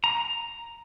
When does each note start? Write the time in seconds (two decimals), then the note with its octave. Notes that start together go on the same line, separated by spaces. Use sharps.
0.04 A#5